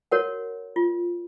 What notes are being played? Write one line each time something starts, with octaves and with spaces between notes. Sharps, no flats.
F#4 A#4 C#5 F#5
F4